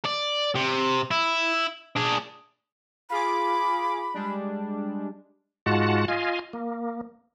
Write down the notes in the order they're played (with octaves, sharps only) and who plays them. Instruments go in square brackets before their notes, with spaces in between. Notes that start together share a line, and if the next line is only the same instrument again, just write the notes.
[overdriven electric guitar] D5
C3
E4
D4 G#4
[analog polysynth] F4 G#4 D6 [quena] B5
[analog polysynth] G3 G#3 D4
[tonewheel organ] G#2 G#3 F4 F#4 F#5 A5
F4 D#5 F5 G#5
A#3